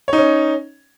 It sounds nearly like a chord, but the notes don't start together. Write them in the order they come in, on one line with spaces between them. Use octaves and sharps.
C#5 D#4 C#4